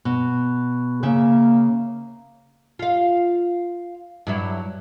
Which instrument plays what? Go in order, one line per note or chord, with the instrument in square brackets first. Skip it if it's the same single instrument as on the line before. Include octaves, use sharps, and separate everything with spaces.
[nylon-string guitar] B2
[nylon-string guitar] C#3 E5 [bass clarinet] A#3
[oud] F4 F5
G2 F#3 E4